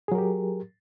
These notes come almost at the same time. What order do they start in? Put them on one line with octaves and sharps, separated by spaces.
G#4 F#3 A#4 G4